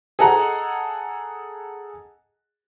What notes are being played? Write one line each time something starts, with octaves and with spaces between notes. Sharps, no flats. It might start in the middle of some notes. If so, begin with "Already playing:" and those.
G#4 A4 D#5 F#5 A#5